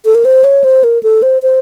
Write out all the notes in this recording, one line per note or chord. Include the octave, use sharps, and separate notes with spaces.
A4
A#4
C5
C#5
C5
A#4
A4
C5
C5